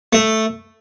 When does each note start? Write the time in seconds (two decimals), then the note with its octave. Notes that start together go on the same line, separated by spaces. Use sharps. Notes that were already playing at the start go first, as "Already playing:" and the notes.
0.13 A3